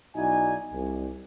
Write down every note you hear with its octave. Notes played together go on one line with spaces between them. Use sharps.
B1 D#4 E4 F#4 D5 G#5
C2